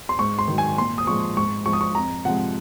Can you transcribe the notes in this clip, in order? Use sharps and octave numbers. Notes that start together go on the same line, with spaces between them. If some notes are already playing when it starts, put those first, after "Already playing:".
C6
G#2 C#6
C6
D#3 F#3
G#5
A#2 C6
D#6
F3 G#3 C#6
G#2 C#6
F3 G#3 C#6
D#6
C#6
F2 A#5
C3 F3 G#3 F#5